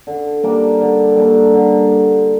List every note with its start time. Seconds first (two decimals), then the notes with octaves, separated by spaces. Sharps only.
0.07 D3
0.43 G3 A#3 D4
0.81 D3
1.16 G3 A#3 D4
1.54 D3